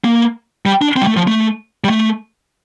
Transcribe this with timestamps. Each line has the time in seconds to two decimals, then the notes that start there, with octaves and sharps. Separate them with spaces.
0.04 A#3
0.66 G3
0.82 D4
0.96 C4
1.02 G3
1.07 A3
1.17 F3
1.27 A3
1.84 G3
1.90 A3